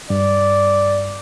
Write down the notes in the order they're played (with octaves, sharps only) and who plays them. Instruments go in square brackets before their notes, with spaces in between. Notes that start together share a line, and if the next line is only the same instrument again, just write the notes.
[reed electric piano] G2 [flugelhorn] D5